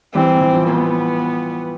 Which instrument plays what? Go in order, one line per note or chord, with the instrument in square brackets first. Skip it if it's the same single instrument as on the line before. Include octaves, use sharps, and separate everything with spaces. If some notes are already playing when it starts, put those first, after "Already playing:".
[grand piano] E3 G3 [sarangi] C4
[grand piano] E3
F3
[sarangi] B3